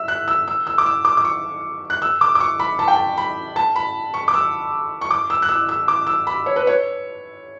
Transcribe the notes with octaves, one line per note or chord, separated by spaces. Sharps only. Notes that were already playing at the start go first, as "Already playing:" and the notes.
Already playing: E5 E6
F#6
E6
E6
E6
D6
E6
D6
D6
C#6
F#6
E6
D6
D6
C#6
B5
A5
G5
A5
B5
A5
B5
C#6
D6
E6
C#6
D6
E6
F#6
E6
E6
D6
E6
B5
C#5
B4
C#5